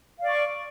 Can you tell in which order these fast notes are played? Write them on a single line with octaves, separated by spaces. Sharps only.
F5 D5 C#6